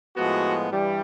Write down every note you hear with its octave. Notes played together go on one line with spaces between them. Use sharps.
A2 F3 G#3 B3 F#4
G2 E3 G3